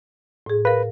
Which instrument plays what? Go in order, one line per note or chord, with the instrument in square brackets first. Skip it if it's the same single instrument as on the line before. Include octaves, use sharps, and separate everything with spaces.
[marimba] A2 G#4
[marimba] A#4 F5 [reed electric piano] B4